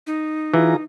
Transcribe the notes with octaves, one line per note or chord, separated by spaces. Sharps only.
D#4
E3 F4 G#4 A#5